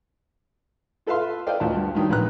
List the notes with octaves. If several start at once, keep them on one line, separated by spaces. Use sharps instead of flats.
F4 A4 B4 E5 F5 C6
A4 C5 D5 D#5 F5 G5
D2 F4 A#4 A5
G2
G2 D#3 F#3 D#4
A#1 G#2 B4 A#5 F#6